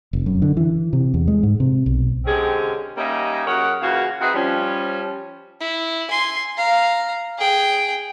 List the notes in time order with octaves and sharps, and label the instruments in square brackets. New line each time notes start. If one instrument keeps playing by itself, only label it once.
[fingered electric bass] F1
F#2
D3
E3
C3
E2
G#3
G#2
C3
B1
[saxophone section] D3 G#3 C4 C#4 G4 G#4
G3 A#3 C#4 D#4 D#5 E5
F#2 G#4 A#4 C#5 F#5
C#3 E3 A#3 F4 F#4
C4 D#4 F#4 G#4 B4 E5
F3 G3 C#4
[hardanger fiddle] E4
G#5 C6
F5 A#5
G#4 G5